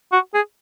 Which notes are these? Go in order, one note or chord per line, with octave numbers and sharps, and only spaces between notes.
F#4
G#4